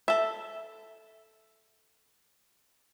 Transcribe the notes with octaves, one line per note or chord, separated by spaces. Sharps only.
A4 E5